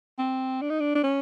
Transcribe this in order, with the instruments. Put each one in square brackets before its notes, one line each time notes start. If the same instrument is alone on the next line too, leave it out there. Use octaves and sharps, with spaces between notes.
[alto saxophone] C4
D4
D#4
D4
D4
C#4